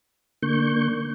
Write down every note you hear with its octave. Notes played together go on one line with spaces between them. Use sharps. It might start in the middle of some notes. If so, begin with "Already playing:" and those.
D3 A#3 C#6 G6